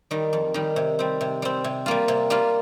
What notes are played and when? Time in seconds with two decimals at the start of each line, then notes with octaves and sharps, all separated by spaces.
0.11 D#3 G3
0.33 F2
0.54 D#3 G3
0.76 C3
0.99 G3 C4
1.21 C3
1.42 G3 C4
1.64 C3
1.86 G3 A#3 F4
2.08 C3
2.30 G3 A#3 F4